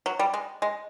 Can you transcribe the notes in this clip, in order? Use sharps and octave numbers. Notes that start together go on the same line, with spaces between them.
F#3
G3
G#3
G#3